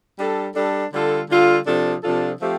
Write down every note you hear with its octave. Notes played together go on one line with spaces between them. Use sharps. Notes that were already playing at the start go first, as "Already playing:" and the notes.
G3 D4 A4
G3 D4 A4
D3 G3 F4 A4
D3 G3 F4 A4
C3 F3 D4 F4 A4
C3 F3 D4 F4 A4
F3 A3 C4 G4